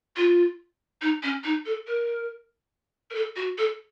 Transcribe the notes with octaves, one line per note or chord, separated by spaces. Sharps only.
F4
D#4
C#4
D#4
A4
A#4
A#4
A4
F#4
A4